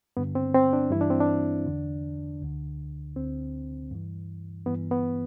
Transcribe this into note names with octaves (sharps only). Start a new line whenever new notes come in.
G2 D3 B3
C4
C4
D4
G2 E3 E4
D4
C4
D4
E2 D3
D2 D3
D2 D3 C4
G2 E3
G2 E3 B3
B3